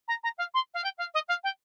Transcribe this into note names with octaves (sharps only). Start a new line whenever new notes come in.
A#5
A#5
F5
C6
F5
G5
F5
D#5
F5
G5